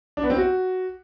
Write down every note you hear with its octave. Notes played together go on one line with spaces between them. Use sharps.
D4
B3
C4
F#4